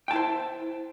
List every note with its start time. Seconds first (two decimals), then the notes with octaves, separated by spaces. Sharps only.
0.08 G5
0.11 A5
0.13 E4
0.16 C5